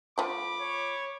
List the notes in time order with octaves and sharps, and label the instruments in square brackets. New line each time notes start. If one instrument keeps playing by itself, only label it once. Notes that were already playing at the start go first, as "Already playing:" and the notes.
[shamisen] F3 A3 [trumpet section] B5 D6
[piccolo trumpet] C#5